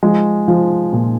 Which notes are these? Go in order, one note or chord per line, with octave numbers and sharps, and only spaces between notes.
F3 G#3
F3
A#2